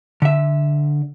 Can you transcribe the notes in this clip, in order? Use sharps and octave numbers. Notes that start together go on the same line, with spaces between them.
D3 E5